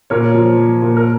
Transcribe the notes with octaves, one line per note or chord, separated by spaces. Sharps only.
A#2 A#4 C#5
F3
F3
A#2
A#4